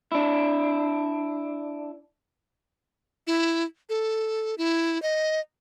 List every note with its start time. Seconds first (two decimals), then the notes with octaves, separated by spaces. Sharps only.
0.12 D4 E4
3.27 E4
3.89 A4
4.58 E4
5.02 D#5